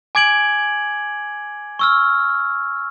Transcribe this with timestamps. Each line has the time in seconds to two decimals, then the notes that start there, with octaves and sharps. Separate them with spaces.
0.15 G#5 D6 G#6 D7 F#7
1.79 C#6 E6 F6